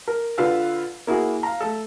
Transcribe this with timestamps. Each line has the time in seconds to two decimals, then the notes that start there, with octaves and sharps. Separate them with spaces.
0.08 A#4
0.38 D3 F4 B4 F5 E6
1.07 A#3 E4 F#4 G#4
1.43 F5 A#5
1.61 A3 A4